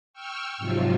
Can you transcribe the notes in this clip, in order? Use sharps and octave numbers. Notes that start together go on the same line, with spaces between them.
G5 C#6 E6 F6
G#2 C3 F3 F#3 F4